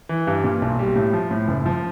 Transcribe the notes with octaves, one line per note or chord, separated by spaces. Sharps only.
E3
G2
A#2
B1
G3
A2
F3
A2
F#1
F3